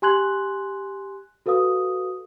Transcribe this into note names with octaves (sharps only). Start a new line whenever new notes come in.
G4 G#5 C6 F#6 G#6 F#7
F#4 A4 B4 F5 D#6